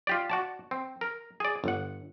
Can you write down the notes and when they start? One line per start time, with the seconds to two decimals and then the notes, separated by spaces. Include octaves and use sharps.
0.07 F4 G4 D5
0.30 F#4 D5 A5
0.71 C4
1.01 A#4
1.40 G#4 D5
1.64 G1 F#5